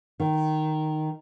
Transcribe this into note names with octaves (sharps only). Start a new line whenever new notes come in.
D#3